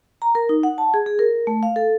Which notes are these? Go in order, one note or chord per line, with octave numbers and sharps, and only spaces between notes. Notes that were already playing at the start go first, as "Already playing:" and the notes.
A#5
A#4
D#4
F#5
A5
G#4
G#4
A#4
A3
F5
A4